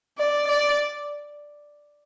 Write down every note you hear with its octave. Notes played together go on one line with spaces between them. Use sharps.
D5
D5